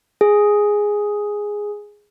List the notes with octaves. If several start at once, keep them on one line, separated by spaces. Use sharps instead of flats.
G#4